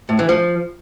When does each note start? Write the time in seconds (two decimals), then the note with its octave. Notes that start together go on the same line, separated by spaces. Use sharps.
0.09 A2
0.19 E3
0.29 F3